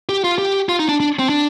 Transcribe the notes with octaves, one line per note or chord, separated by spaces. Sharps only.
G4
F4
G4
F4
D#4
D4
D4
C4
D4